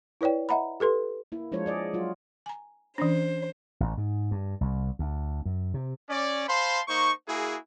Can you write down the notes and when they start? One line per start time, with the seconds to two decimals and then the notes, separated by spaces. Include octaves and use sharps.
0.21 E4 B4 C#5 D5 G5
0.49 D#5 E5 F#5 A#5 B5
0.80 G4 A4 B4 C6
1.32 A#3 E4
1.52 F3 G#3 D4 F4 C5 C#5
1.66 G#4 D5 D#5
1.93 F#3 F4 F#4
2.46 G#5 A#5
2.98 E3 C#4 D4 C5
3.80 A1
3.98 G#2
4.31 G2
4.61 C2
4.99 D2
5.45 F#2
5.74 C3
6.10 C#4 D5
6.48 C5 F5 A5 B5 C6
6.88 A#3 D#4 C5 C#6
7.28 A#3 E4 F#4 G#4